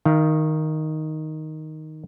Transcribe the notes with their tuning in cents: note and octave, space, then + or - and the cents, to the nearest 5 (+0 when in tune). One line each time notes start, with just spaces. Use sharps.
D#3 +0 F5 -30